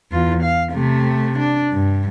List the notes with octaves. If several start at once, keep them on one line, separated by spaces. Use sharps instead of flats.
E2 F4
F5
C3 A3
D4
G2